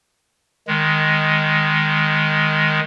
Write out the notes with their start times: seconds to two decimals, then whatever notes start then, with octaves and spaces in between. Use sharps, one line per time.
0.67 D#3 G#3